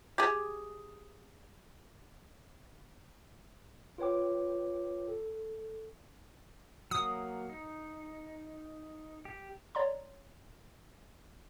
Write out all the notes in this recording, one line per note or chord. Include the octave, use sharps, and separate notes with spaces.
G4 G#4
F4 B4 C#5 G5 D6
A4
F#3 A#3 D#6
D#4
G4
C#5 D5 A#5 C6